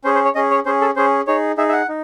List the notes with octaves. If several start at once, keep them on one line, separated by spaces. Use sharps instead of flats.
C#4 G#4 C5
C5
C#5
C#4 G#4 D#5
C#5
C#4 G#4 C5
A4
C#4 G#4 C5
D#4 G#4 C#5
D#4 G#4 E5
E5
F#5
D#4